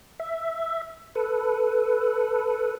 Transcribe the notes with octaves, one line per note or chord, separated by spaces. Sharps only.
E5
A4 B4